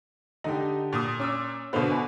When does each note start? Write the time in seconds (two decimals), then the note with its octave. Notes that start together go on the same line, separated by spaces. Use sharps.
0.44 D3 D#4 G4
0.93 A#2 D#6
1.19 C#4 D6 E6
1.73 B2 D3 B4 C5 F5
1.90 G#5